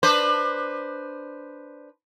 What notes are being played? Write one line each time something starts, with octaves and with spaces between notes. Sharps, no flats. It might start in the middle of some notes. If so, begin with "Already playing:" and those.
D4 B4 C5